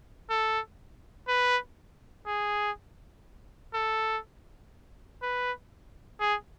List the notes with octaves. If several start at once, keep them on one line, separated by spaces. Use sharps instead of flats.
A4
B4
G#4
A4
B4
G#4